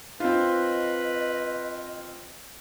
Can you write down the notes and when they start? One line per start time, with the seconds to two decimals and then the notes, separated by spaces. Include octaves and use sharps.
0.20 C4 F4 B4 D#5